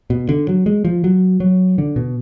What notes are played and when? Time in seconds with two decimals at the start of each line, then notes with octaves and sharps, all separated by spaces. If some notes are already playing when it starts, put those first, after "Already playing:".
0.10 B2
0.29 D3
0.48 F#3
0.66 G#3
0.85 F3
1.04 F#3
1.40 F#3
1.78 D3
1.96 B2